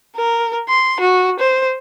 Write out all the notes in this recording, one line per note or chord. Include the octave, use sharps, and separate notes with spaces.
A#4
C6
F#4
C5